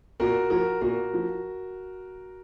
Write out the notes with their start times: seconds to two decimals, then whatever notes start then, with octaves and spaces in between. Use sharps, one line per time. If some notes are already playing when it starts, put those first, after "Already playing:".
0.20 A#2 F#4 A#4
0.50 F3 F#4 A#4
0.81 A#2 F#4 A#4
1.13 F3